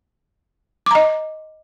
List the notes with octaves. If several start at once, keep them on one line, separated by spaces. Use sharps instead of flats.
D#5 A#5 D6